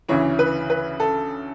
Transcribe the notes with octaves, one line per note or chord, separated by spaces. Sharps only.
D2 C#3 E3 C#5
B4
B4
A4